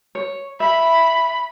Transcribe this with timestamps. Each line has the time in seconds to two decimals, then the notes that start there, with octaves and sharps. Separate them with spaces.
0.15 C#5
0.60 E5 B5